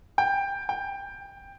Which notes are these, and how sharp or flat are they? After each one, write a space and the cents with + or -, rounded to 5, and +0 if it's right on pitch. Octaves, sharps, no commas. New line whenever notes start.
G5 +15
G5 +15